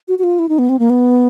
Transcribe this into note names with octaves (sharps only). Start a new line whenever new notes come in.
F#4
F#4
F4
E4
D#4
B3
C4
A#3
B3